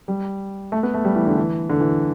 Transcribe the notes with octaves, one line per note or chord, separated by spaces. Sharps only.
G3
A3
B3
A3
G3
E3
D3
E3
D3
E3